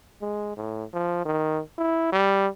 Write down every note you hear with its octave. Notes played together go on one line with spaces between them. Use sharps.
G#3
A2
F3
D#3
E4
G3